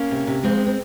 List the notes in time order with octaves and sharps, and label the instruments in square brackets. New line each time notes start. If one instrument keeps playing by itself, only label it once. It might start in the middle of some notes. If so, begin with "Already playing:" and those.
Already playing: [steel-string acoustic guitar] A#3 C#4
C3
C3
F2 G#3 C4
C4